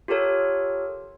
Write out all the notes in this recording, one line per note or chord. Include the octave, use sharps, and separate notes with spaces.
F4 G4 A4 A#4 C#5